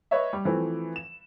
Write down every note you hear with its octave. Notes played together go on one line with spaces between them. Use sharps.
B4 C#5 D#5 E5
G3
E3 F3 A3 C4
E7